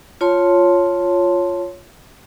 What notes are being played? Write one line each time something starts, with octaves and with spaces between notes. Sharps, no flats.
F4 C#5 A5 C6